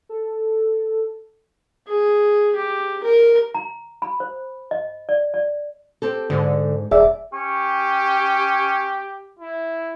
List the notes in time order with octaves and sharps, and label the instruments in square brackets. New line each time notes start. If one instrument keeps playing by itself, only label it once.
[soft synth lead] A4
[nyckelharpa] G#4
G4
A#4
[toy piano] A#5
B5
C5
D#5
D5
D5
[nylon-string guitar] C4 G4 A4
[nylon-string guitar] G#2 [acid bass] D3
[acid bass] D#1 [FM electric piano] G#4 E5 [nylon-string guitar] D5
[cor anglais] C#4 [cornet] G4
[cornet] E4